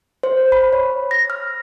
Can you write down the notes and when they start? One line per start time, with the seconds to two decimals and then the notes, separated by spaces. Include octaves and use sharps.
0.23 C5
0.52 B5
0.73 C#5
1.11 A#6
1.30 F6